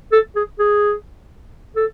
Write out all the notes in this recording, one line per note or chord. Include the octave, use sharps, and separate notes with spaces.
A4
G#4
G#4
A4